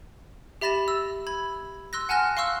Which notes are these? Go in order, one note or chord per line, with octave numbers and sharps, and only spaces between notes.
G4 E5 B5 A6 A#6 E7
E6
B5 G#6
C6 E6 F#6 A#6
F#5 G#5 A5 F6 F#6 A#6
F5 C6 C#6 E6 F#6